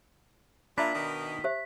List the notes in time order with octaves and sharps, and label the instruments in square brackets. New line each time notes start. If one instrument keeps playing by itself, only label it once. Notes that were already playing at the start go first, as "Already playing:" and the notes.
[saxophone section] A#2 [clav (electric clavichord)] D4 [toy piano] E5 A#5 B5 [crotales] B6
[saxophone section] B2 D#3
[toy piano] G4 C5 E5